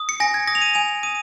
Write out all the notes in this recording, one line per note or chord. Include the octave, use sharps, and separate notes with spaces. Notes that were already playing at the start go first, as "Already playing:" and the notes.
Already playing: D#6
C#7
G#5 A#6
G#6
D#6 A#6
F7
D#7
G#5 F7
D#6 D#7